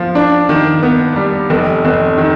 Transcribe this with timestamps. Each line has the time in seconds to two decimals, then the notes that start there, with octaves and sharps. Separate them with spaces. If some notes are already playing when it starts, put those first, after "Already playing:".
Already playing: F3
0.15 D4
0.49 D#3
0.83 B3
1.16 G3
1.50 F1
1.85 F1
2.18 D#3